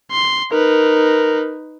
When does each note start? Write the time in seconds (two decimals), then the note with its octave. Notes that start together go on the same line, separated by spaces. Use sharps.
0.12 C6
0.52 D#4 A#4 B4